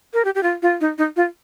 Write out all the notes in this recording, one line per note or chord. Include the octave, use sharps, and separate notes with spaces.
A#4
G4
G4
F4
F4
D#4
D#4
F4